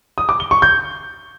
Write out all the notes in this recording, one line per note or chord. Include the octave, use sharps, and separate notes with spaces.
D#6
D6
G7
C#6
G6